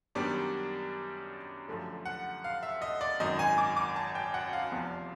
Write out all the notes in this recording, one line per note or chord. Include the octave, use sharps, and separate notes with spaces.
F#2 D#3 G3 B3 D4
F#2 D3 F3 A3
F#5
F5
E5
D#5
D5
G#1 F#2 D#3 D#5
G#5
D6
D6
A5
G5
F#5
F5
F1 E2 C3 F3